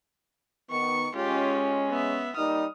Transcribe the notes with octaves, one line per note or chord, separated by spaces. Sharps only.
D#3 B3 C#6 C#7
G#3 C#4 F4 G4
B3 E5
G3 A#3 D#4 D#6 F6